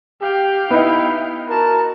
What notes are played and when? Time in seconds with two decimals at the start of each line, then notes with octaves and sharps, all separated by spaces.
0.22 G4 F5 G5
0.70 B3 D#4 E4
1.49 F#4 A#4 A5